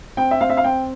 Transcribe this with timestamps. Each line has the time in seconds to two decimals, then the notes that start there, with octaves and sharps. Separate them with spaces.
0.17 C4 G5
0.31 E5
0.41 C4 F5
0.50 E5
0.57 F5
0.64 C4 G5